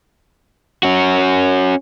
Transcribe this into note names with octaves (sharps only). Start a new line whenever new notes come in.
C#4 F#4